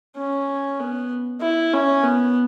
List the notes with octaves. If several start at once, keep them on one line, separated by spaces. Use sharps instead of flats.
C#4
B3
E4
C#4
B3